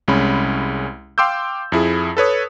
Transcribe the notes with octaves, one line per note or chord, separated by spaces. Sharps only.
C2 G#3 C#4 B5
F5 G5 C6 D6 E6 G6
F2 E4 G#4
A4 B4 C#5 D#6